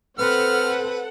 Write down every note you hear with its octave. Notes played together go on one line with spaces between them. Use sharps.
C4 A4 B4 F#5 F6